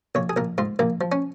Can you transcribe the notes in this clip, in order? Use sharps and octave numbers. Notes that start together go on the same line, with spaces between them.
A#1 C#5
G#4
A#1 A#4
G#2 F4
A#1 A#3
F3
C#4